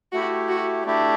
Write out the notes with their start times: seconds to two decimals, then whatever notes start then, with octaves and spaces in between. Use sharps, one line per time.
0.12 A3 E4 F#4 G4
0.49 F#4
0.86 A3 D4 E4 G4